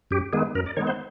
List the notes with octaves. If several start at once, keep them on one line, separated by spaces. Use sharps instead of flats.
F#2 G4
D#3 G#3 B3 G#4
F#2 A#4
D5
D#3 G#3 B3 C#5
C5